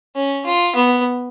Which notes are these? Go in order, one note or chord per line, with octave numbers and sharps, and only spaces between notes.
C#4
F4
B3